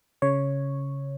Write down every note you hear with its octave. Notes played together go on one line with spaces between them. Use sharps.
C#3 C#5